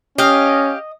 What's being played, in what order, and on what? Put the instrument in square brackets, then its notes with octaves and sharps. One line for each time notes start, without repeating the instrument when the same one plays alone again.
[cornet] C#4 [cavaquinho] G4 F5 [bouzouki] D#5